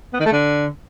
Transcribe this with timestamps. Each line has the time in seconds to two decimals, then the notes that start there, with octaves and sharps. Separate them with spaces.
0.13 B3
0.20 D#3
0.26 A3
0.32 D3